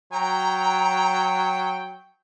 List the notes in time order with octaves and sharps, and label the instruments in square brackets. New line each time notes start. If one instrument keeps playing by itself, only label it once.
[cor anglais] F#3 [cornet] G5 [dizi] A#5